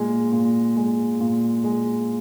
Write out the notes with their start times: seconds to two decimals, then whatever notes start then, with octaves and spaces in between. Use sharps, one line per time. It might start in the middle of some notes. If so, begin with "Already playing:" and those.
Already playing: A#2 G#3
0.32 A#2
0.77 G#3
1.20 A#2
1.64 G#3